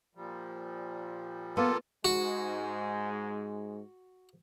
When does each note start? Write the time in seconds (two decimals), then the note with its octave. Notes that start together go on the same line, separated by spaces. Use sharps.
0.15 A#2 F3 G3
1.57 A#3 B3 F4 A4
2.05 G#2 G#3 F#4